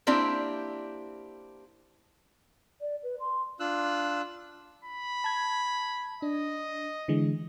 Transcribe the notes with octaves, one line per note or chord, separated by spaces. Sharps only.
A#3 C4 D4 E4 G4 D5
D5
B4
C6
D4 F4 E6 F#6
B5
A5 G#6
D4 D#5
D3 E3 G#3